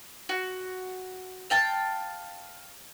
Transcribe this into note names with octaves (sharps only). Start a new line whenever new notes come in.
F#4
F5 G5 A5